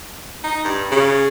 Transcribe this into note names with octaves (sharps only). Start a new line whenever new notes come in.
D#4
G2
C#3